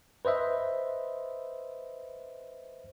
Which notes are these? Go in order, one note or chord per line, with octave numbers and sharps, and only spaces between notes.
B4 C5 D#5 E5